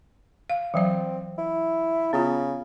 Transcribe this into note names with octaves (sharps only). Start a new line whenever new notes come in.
F5
E3 F#3 C4 D5
E4
C#3 B3 F4